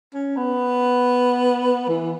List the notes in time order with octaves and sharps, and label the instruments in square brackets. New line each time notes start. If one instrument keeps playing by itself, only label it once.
[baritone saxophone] C#4
B3
E3